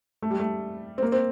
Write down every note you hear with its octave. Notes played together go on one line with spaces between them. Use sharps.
A3
G3
A3
C4
A#3
C4